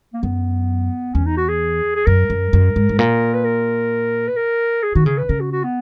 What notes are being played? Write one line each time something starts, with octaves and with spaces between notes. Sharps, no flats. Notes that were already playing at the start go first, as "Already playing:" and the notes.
A#3
F#2 B3
E2 C#4
D#4
F#4
G#4
G#4
F#2 A#4
F#2
F#2
G#2
G#2
A#2 A#4
B4
A#4
B4
A#4
G#4
D#3 F#4
C#3 G#4
B4
C#3 A#4
F#4
F#4
B3